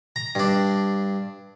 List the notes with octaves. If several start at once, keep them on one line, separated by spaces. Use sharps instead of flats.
A#5
G2 D4